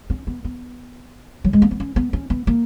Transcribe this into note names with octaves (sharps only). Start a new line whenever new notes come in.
C#4
B3
B3
F#3
G#3
A#3
B3
C#4
B3
C#4
B3
A#3